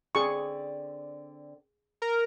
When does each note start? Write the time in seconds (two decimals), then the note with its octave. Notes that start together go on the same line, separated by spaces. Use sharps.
0.15 D3 C4 G#4 D5 C#6
2.02 A#4